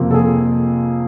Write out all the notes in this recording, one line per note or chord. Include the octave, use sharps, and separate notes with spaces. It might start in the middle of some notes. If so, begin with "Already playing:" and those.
Already playing: F2 C3 F3 A#3
A4
G#4